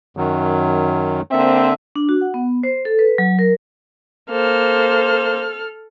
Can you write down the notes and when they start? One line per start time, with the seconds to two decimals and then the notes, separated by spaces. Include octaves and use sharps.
0.17 F#2 D#3 F#3
1.31 D3 A#3 C4 E5
1.96 D4
2.09 F#4
2.21 F#5
2.34 B3
2.63 C5
2.85 A4
2.99 B4
3.18 F#3
3.39 A#4
4.31 A#3 A4 C5 F6